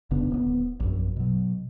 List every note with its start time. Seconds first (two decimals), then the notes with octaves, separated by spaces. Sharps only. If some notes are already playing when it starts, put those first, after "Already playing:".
0.11 F1 C#3 B3 D4
0.31 D1 B3
0.80 A#1 F#2
1.16 B2 F#3